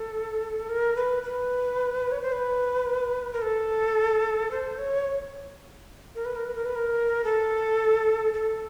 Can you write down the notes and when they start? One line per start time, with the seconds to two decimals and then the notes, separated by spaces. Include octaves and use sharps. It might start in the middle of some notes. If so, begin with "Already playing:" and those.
Already playing: A4
0.69 A#4
0.96 B4
1.23 B4
2.12 C#5
2.22 C5
2.32 B4
3.33 A#4
3.42 A4
4.51 C5
4.78 C#5
6.15 A#4
6.25 B4
6.36 A#4
6.45 B4
6.55 A#4
6.65 B4
6.75 A#4
7.24 A4
8.34 A4